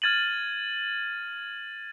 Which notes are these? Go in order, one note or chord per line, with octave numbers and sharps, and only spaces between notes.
F6 G#6 A6 D#7 F#7